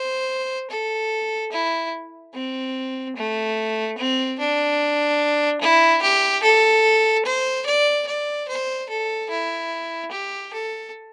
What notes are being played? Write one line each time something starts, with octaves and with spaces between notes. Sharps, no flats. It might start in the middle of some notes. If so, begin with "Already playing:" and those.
Already playing: C5
A4
E4
C4
A3
C4
D4
E4
G4
A4
C5
D5
D5
C5
A4
E4
G4
A4